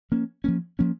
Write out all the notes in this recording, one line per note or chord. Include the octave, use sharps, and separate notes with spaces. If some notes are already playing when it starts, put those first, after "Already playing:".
F3 A#3 C#4
F3 A#3 C#4
F3 A#3 C#4